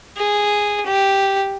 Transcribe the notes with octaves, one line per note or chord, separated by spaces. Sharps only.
G#4
G4